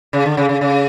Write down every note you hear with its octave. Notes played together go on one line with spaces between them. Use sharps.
C#3
D3
C#3
C#3
C#3